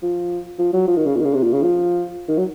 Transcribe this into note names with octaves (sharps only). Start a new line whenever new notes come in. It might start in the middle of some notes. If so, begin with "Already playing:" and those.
F3
F3
F#3
F3
D#3
C#3
A#2
D#3
C#3
C3
A#2
C#3
F3
D#3
F#3